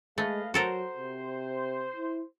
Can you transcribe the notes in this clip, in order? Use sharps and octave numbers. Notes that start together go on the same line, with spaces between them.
G#3 A3 B4 D#5 F5
F#3 F#4 A4 A#4 C5
C3
E4